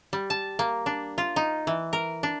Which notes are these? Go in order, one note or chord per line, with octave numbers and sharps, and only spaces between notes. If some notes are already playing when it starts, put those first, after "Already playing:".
G3
A5
A#3
D4
F4
D#4
E3
A#4
D4